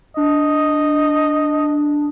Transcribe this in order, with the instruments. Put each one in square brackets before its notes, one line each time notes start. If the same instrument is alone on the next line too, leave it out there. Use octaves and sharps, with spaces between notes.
[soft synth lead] D4 [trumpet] D#5